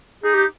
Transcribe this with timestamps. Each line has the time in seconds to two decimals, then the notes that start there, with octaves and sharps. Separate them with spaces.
0.24 D#4 G#4
0.34 G4